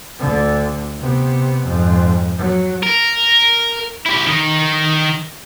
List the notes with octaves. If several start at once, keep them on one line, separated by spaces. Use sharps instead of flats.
D2 D3
C3 B3
F2 G#2
F#3
A#4
E4 G4
D#3 D#4